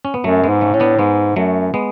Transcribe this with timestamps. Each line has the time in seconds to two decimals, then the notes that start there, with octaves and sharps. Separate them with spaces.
0.05 C#4
0.14 B3
0.24 F#2 F#3 A3
0.44 G#3 B3
0.49 G#2
0.61 A3 C#4
0.74 A2 C#4
0.80 B3 D4
0.99 G#2 G#3 B3
1.36 F#2 F#3 A3
1.74 G#3 B3